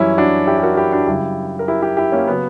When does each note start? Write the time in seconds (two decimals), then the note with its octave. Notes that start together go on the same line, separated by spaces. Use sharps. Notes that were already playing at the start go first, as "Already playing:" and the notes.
Already playing: F#2 E3 G3 C#4 E4
0.18 D4 F#4
0.47 E4 G4
0.58 G4
0.63 F#4 A#4
0.77 E4 G4
0.92 D4 F#4
1.07 F#2 C#3 G3 E4 G4
1.59 A#4
1.68 E4 G4
1.82 E4 G4
1.97 E4 G4
2.12 A#3 C#4
2.27 C#3 F#3 B3